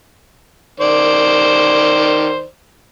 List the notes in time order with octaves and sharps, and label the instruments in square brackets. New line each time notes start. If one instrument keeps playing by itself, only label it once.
[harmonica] D#3 C5 D5